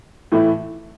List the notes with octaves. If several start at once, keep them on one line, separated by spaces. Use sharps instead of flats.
A2 E3 A3 E4